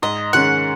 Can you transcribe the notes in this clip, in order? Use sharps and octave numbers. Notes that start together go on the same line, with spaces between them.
G#2 D#5
D#3 G#3 C#4 F#5